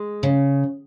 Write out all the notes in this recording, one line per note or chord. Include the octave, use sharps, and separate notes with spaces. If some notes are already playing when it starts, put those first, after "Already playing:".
Already playing: G#3
C#3